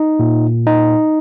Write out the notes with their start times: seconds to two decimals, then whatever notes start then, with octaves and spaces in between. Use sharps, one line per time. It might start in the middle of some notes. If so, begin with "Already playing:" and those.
Already playing: D#4
0.20 A#2
0.67 D#4